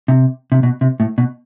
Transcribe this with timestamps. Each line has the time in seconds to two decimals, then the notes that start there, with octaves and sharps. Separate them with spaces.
0.08 C3
0.52 C3
0.63 B2
0.81 C3
1.00 A2
1.18 B2